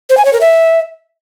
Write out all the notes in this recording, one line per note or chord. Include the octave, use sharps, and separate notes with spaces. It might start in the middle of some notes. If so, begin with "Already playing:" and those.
C5
G#5
C#5
A#4
E5